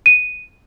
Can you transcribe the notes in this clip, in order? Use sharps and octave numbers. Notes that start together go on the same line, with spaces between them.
D#7